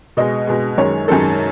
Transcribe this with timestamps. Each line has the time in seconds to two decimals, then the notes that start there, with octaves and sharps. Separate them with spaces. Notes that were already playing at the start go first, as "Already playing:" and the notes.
0.17 B2 G#3 D#5
0.47 B2 G#3
0.78 F#2 D#3 G#3 C#5
1.08 F#2 D#3 G#3 A4